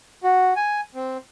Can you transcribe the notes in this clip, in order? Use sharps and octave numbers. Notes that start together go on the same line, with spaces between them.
F#4
G#5
C4